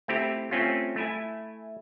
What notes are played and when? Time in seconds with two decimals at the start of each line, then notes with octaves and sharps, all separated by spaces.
0.08 A3 C4 E4 G4
0.51 A3 C4 C#4 F4
0.96 A3 E4 G#5